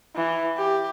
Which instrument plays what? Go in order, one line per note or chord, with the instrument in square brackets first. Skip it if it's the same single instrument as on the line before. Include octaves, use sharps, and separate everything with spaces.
[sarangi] E3
G4